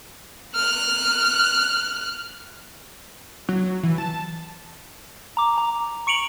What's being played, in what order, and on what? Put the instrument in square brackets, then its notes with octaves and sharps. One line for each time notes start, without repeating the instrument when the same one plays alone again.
[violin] F6 F#6
[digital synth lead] F#3
E3
A5
[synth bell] A#5 D6
A#5
C#6 C#7 D7 F7 F#7